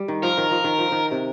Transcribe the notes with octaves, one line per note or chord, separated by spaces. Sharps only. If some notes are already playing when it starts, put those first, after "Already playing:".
Already playing: G3
D#3
F3 A#4
D#3
F3
D#3
F3
D#3
C3